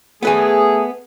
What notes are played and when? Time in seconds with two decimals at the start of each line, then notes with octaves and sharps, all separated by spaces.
0.23 A3 B3 G#4 B4 G#5